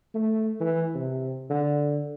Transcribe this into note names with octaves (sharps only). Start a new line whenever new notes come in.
A3
E3
C3
D3